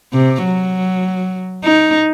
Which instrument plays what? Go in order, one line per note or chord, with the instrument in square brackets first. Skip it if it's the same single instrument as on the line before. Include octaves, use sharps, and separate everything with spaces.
[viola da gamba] C3
F#3
D#4